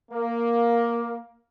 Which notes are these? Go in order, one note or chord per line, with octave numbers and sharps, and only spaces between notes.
A#3